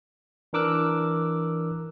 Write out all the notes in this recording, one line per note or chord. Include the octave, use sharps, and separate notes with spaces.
E3 D4 A#4 D6 E6 F#6